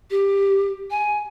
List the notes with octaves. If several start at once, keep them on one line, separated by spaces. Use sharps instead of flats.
G4
G#5